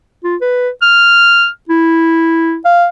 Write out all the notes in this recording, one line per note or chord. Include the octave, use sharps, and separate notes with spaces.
F4
B4
F6
E4
F5